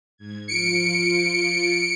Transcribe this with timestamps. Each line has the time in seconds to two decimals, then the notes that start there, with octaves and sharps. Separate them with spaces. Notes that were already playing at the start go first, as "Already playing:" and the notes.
0.17 G#2 G#6
0.48 F3 F4 C#7 D7